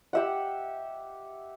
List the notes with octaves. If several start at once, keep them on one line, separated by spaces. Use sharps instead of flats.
G4 E5 F#5